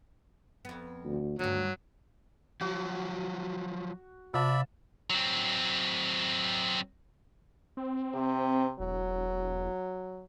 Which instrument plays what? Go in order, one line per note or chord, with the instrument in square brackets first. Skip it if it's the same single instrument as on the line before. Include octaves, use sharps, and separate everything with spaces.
[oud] F2 B3
[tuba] D2
[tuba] D2 [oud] G2 D#3 [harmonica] F#3
[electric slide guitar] F3 F#3 [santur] F#4
[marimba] C3 [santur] F4 A5 [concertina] D5 E5 B5
[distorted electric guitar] F#3 C4
[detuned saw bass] C4
[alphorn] C3
[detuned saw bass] E1 [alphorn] F#3